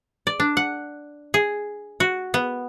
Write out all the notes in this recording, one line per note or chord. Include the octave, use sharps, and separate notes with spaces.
D5
D4
F#5
G#4
F#4
B3